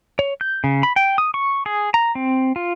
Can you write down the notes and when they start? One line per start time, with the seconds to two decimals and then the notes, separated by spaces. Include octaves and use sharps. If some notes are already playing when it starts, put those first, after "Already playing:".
0.19 C#5
0.41 G6
0.64 C#3
0.83 B5
0.96 G5
1.18 D#6
1.34 C#6
1.66 G#4
1.94 A#5
2.15 C4
2.56 F4